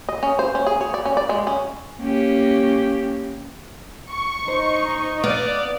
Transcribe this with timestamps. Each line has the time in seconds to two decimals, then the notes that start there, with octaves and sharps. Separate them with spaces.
0.09 D#5
0.23 C#4
0.39 C5
0.55 C#4
0.67 G#4
0.81 C#5
0.94 D5
1.05 C#4
1.17 D5
1.29 G#3
1.47 C#4
2.00 A#3 C#4 G4
4.10 C#6
4.48 D#4 C5
5.24 B3 D5 F5